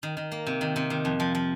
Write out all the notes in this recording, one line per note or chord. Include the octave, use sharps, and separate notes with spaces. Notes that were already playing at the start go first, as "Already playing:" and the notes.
D#3
D#3
A#3
C3
D#3
C3
D#3
F2
F3
F3